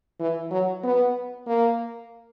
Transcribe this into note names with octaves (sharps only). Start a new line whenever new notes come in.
E3
F#3
B3
A#3